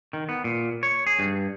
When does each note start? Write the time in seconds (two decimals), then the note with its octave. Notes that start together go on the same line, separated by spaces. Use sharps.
0.13 D#3
0.29 B3
0.44 A#2
0.83 C#5
1.07 G#4
1.19 G2